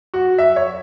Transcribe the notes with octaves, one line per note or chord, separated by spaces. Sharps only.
F#4
E5
C#5